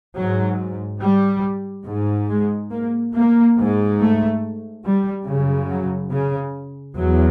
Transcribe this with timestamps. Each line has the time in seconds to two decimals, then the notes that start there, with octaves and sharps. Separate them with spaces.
0.16 G#2 F#3
1.01 G3
1.86 G#2
2.29 G#3
2.71 A#3
3.14 A#3
3.57 G#2
4.00 A3
4.84 G3
5.27 F#2 C#3
5.70 F#3
6.12 C#3
6.98 E2 F#3